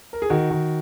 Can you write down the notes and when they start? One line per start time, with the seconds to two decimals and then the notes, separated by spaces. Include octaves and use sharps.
0.13 A#4
0.22 G#4
0.30 D#3 F#4
0.51 D#3